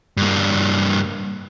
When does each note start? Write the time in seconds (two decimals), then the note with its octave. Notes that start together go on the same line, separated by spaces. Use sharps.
0.17 G2 A#3